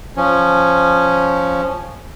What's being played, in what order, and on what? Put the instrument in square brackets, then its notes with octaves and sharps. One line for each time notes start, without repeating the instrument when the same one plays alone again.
[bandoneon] F3 C#4